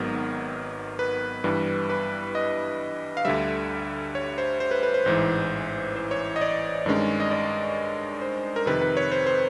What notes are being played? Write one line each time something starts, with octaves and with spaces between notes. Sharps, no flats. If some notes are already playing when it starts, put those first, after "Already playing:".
Already playing: G#1 G#2 D#3 F#3 B3 A#4
B4
G2 E3 G3
B4
D#5
F5
D2 D3 G3 E5
C#5
C5
C5
B4
B4
C5
A1 G#2 E3 C5
C5
C#5
D#5
D5
G2 D#3 G#3 C#4
D#5
D5
C5
A#4
F2 C3 D#3 B4
B4
C#5
C5
C5